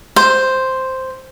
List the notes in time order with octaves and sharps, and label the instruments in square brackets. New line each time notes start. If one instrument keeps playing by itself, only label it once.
[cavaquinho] C5